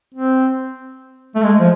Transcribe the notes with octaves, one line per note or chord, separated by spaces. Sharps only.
C4
A3
G#3
F3